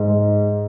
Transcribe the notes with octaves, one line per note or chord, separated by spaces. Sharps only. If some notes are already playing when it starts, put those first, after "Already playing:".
Already playing: G#2